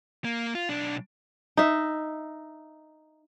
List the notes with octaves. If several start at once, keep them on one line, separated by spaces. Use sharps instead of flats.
A#3
F4
B1 D4
D#4 E5